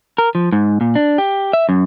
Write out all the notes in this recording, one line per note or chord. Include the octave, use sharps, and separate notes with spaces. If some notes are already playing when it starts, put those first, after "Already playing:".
A#4
F3
G#2
A#2
D4
G4
E5
F#2